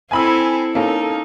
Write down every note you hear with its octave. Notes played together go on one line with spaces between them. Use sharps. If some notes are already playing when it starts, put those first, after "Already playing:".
C4 E4 A4 G#5 B5 E6
A#3 C#4 D#4 A4